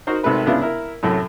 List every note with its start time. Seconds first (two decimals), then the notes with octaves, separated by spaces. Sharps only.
0.07 D#4 F#4 A#4 C5
0.23 G#1 C3 D#3 A3 B4 B5
0.47 C#3 B3 D4 E4 F4
0.62 E4 A#4
1.03 F#2 A2 C3 F#3 A3